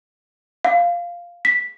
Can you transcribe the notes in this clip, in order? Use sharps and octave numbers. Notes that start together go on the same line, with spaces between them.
F5
B6